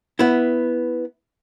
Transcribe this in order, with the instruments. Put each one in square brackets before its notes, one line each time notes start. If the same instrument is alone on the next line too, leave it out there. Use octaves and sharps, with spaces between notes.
[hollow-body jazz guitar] B3 E4